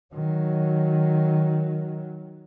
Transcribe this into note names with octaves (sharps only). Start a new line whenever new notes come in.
D#3 F#3